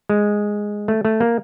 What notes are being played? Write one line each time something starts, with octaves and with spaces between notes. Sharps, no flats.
G#3
A3
A3
A#3